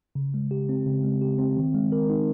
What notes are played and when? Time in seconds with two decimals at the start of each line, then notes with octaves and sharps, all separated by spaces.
0.15 C#3
0.34 G#3
0.51 G4
0.69 C4
0.87 C#3
1.04 G#3
1.21 G4
1.39 C4
1.57 D#3
1.75 G#3
1.92 A#4
2.10 D#4